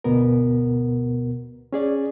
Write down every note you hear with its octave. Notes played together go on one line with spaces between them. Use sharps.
D2 B2 B3 A#4
C#4 G#4 D5